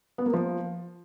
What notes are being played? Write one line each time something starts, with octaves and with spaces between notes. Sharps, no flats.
B3
A#3
F3